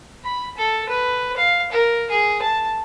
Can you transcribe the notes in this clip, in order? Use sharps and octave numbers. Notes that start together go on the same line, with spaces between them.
B5
A4
B4
F5
A#4
G#4
A5